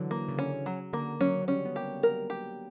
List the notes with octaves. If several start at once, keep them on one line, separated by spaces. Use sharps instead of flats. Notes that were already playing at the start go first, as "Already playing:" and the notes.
Already playing: D3 E3 F#3
A#3
C#3
D3 C#4
C#3 F#3
D3 A#3
F#3 C#4
F#3
G3 C#4
B3
A#3 G4
F#3 A#4
G4